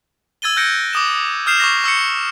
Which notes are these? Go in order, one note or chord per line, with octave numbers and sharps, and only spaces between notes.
E6 G#6 A6 D#7 G7
E6 F#6 G6 A#6 C#7 D7
D6 D#6 E7
D#6 F6 G6 C7 E7 F7
C#6 D6 A#6
C#6 E6 G6 C#7